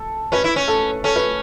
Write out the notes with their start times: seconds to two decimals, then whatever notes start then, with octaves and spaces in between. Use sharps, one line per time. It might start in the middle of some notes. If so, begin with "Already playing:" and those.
Already playing: A4
0.32 C#4 B4
0.44 E4
0.56 C#4
0.68 A4
1.04 C#4 A4
1.16 B4